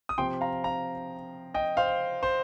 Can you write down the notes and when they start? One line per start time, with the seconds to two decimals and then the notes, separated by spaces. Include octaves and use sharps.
0.09 D#6
0.18 C3 F3 C4 G5 C6
0.41 F5 A#5
0.64 F5 A#5
1.54 D#5 G5
1.77 C5 F5
2.23 C5